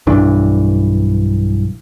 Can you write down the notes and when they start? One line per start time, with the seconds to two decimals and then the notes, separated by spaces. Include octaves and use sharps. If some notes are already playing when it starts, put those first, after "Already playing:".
0.07 B1 G2 E3 D4